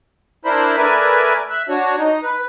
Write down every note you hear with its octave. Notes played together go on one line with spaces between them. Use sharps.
D4 E4 A#4 C5 B5
A3 A#4 B4 D5 E5 G#5
E5 F#6
D4 F#4 C#5
D#4
B4